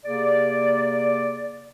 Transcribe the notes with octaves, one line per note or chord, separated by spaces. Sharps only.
C3 A#3 G#4 D5